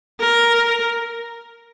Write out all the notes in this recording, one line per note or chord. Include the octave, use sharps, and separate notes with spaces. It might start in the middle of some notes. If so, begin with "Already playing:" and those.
A#4